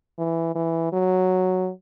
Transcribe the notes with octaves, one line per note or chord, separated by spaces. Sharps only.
E3
E3
F#3